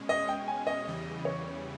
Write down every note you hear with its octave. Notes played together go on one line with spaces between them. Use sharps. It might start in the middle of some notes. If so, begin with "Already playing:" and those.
Already playing: B2 G#3 C#4
D#5
G5
G#5
D#5
E2 C#3 E3 G3
C#5